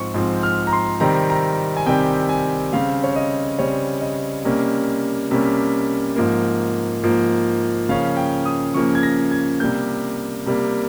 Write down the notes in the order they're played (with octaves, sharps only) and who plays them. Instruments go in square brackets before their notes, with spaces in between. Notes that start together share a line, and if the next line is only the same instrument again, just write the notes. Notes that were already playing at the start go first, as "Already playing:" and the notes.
Already playing: [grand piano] G#2 F3 C4 C#6
G#2 F3 C4
F6
A#5
C6
C3 D#3 G3 C4 A#5
A#5
G#5
C3 D#3 G3 C4 G5
G#5
C#3 G3 C4 F5
C#5
D#5
C#3 G3 C4 C#5
D#5
C3 G3 A#3 C#4
C3 G3 A#3 C#4
G#2 F3 A#3
G#2 F3 A#3
C#3 F3 A#3 C#4 F5
G5
D#6
C#3 F3 A#3 C#4 C#6
G#6
A#6
G#6
C3 G3 A#3 G6
C3 G3 A#3